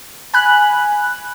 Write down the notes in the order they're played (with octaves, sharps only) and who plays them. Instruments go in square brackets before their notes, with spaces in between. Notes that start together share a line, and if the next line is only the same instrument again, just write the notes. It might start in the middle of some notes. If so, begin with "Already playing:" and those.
[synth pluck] G#5 B5 F#6